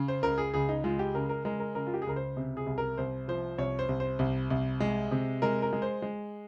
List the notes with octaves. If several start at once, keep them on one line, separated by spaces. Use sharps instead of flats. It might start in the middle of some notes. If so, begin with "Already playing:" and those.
Already playing: C#3
C5
C#2 A#4
G#4
C#2 G#4
D#4
G#3 F4
G4
C#3 A#4
A#4
G#3 A#4
A#4
C#3 A#4
F4
G4
G#4
C#2 A#4
C5
C3
G#4
C2
A#4
C2 C5
F3 C5
C2 C#5
C5
C2
C5
C2
C2
G#3
C3
G#3 A#4
A#4
G#3
C5
G#3